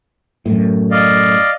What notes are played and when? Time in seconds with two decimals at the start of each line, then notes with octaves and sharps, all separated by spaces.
0.46 F#2 A2
0.91 D5 D#5 F5